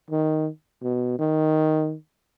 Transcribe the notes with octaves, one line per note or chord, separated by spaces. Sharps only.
D#3
B2
D#3